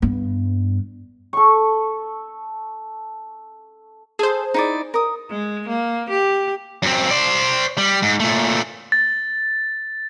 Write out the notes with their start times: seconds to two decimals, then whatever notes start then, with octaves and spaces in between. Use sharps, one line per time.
0.02 G2 B3
1.33 A4 C#6
4.19 G#4 A4 C5
4.54 D#4 E4 D5
4.94 A#4 D#6
5.31 G#3
5.68 A#3
6.10 G4
6.83 F#2 C4
7.11 C5 D5
7.78 G3
8.02 G#2
8.20 A#2 A3
8.92 A6